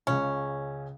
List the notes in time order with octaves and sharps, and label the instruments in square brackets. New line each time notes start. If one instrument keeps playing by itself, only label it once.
[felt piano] C#2 C#3 [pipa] C#4